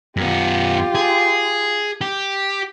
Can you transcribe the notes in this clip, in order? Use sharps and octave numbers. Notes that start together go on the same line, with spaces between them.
F#2 B3 F4 G4
G#4
G4